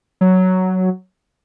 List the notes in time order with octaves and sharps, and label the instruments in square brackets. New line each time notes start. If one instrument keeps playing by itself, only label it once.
[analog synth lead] F#3